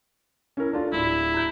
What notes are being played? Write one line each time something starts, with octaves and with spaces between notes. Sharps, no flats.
C#4 E4 A#4
A3 D4 F4
D1 D4 E4
A#5 G6